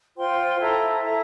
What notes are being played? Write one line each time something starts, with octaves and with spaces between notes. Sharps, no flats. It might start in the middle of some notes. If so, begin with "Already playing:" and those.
F4 C5 G5 C6
E4 A4 E5 A#5
E4 A4 E5 A#5